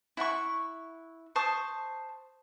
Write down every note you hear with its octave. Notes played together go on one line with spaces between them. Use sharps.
E4 F#5 G5 C#6
C5 A5 C#6 D#6